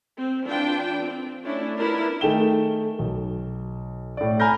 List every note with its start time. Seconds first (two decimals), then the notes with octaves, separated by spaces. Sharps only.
0.17 C4
0.46 E3 D4 F4 G5
1.00 C4
1.43 A3 C#4 D4 E4
1.79 B3 D4 E4 F4 A#4 B4
2.21 D#3 A3 G#4 G5 E7 G7
2.99 B1
4.17 A2 D5
4.40 G#5 A#5 B5 F6 G6 A#6